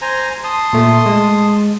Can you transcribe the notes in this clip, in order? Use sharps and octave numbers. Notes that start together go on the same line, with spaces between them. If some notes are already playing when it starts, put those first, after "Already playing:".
C5 G#5 A#5
A5 C6 D#6
A#2 A3
G#3